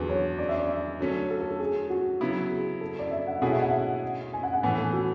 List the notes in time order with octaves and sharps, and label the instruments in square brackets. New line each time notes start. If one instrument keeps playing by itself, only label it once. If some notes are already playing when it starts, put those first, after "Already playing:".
Already playing: [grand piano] E2 D3 F#3 [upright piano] G#4 B4
[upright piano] C#5
D5
E5
D5
[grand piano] D3 F#3 A3 C#4 [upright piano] C#5
[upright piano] A4
A4
A4
G#4
F#4
[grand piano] C#3 F#3 B3 E4
[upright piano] G#4
A4
D5
E5
F#5
[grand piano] B2 A3 C#4 E4 G#4 [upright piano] F#5
[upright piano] E5
F#5
E5
G#5
F#5
F#5
[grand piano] A2 E3 B3 [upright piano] G#5
[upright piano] A4
F#4